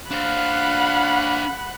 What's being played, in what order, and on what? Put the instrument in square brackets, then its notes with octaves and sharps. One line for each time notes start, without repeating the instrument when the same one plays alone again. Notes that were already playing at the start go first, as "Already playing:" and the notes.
[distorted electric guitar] D4 C5 [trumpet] F5 [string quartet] F#5 B5 F#6